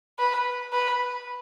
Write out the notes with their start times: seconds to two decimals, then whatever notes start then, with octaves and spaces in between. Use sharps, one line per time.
0.19 B4
0.73 B4